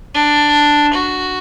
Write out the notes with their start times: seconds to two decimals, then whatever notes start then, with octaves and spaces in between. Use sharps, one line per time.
0.14 D4
0.94 F#4